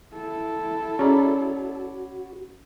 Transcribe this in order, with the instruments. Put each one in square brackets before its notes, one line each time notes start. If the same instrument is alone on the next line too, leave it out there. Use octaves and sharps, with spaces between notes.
[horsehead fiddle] E4 A4
[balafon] C#4 G#4 A#5 [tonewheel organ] F#4 [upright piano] C#5 D5 B5